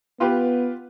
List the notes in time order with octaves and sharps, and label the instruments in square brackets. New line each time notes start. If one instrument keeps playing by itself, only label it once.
[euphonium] B3 [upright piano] F4 G4 B4